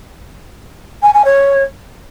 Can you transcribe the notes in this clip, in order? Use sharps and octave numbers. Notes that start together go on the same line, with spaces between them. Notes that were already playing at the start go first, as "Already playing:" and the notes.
G#5
G#5
C#5